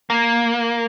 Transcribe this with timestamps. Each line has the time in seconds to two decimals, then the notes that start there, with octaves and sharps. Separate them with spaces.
0.10 A#3